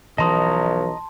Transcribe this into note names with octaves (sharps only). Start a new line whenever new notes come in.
B1 E3 F3 D#5 A5 A#5 C6 D#6